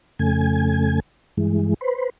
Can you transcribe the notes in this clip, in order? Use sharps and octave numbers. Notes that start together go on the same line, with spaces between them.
F2 C#3 A3 G#5
G2 E3 G#3
B4 C5